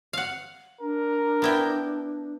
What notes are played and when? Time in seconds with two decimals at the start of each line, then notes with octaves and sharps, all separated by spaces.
0.13 F5 F#5
0.81 D4 A#4
1.42 B3 E4 G5